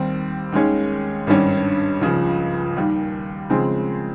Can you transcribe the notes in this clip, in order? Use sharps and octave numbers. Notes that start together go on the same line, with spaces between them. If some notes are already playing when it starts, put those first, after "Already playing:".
Already playing: D#2 D#3 G3 C4
D#2 D#3 G#3 C#4
G#1 G2 G3 C#4
C#2 C#3 F3
D#2 D#3 G3
C#3 F3 G#3 C4